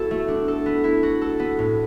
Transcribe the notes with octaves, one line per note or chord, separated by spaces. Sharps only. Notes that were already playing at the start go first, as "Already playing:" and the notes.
Already playing: B3 E4 F#4 A4
A3
D4
A4
B3
E4
F#4
A4
B3
A2